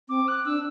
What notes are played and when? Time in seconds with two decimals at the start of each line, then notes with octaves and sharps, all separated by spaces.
0.09 C4 D6
0.27 F#6
0.45 D4 E6